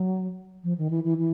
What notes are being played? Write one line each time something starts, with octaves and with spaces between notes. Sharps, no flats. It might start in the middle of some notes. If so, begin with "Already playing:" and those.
Already playing: F#3
F3
D#3
E3
E3
E3